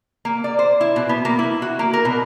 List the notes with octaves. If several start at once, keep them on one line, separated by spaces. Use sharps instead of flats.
A#3
D5
C5
E4
B2
B3
A#3
E4
F#4
A#3
A#4
B2